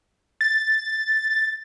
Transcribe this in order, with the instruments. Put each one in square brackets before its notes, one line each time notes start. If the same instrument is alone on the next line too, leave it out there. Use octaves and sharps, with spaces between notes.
[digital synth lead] A6